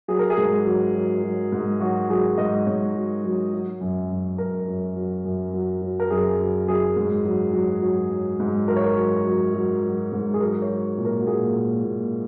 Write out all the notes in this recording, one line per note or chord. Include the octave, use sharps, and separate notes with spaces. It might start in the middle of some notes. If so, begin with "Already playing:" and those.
F#3 G#4
A#4
G#4
G#2
F#3
F#3
F#3
G#2
F#3 F#4
F#3 G#4
G#2 D#5
G#2 C#5
F#3
F#3
F#3
F#2
F#2
F#2 A#4
F#2
F#3
F#2
F#3
F#3
A#4
F#2 G#4
F#3
F#3 G#4
G#2
F#3
F#3
F#3
F#3
G#2
F#3 A#4
C#5
A#4
F#3
F#3
F#3
F#3
G#2
G#4
F#3 A#4
C#5
F#3
A#2
A#4
F#4
A#2 G#4
A#2
A#2